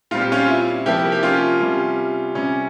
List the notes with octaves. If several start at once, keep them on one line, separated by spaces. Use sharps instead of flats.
A#2 G3 C4 F4
G4
C#4 F4
E4
C3 F3 A#3 E4 G4
G4
C#4 F4
C3 G3 C#4
C3 G3 C#4